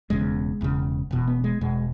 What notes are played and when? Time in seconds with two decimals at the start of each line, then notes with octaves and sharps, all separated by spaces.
0.10 E1 E2 C#3 G#3
0.61 E1 E2 C#3
1.11 E1 E2 B2
1.28 B3
1.44 G#3
1.61 E1 E2 B2 G#3